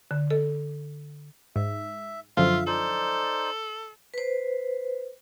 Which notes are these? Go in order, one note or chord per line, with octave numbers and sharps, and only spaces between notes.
D3
A4
G#2 E5
F#2 D3 F3 F4 E5 F5
D#4 A4 C5 D5
B4 C5